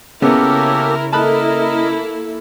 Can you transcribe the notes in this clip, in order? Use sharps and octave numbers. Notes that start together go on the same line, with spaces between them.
C#3 A#3 B3 C#4 E4 G4 A4 A#4
A#3 E4 A4 A#4 D#5 A5 B5 F#6